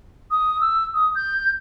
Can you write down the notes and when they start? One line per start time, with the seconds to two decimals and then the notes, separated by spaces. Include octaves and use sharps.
0.31 D#6
0.61 E6
0.94 D#6
1.15 G6